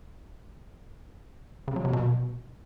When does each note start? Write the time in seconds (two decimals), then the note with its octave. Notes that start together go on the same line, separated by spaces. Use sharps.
1.68 C#3
1.76 F#3
1.85 C3
1.93 B2